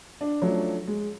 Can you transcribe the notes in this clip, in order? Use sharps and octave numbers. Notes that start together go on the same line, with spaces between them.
D4
F3 F#3 A3 C#4 D4
G#3